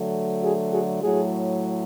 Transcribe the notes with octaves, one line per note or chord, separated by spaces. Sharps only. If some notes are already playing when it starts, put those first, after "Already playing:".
Already playing: D3 F#3 A3
F#4 G#4
F#4 G#4
A2 F#3 A3 F#4 G#4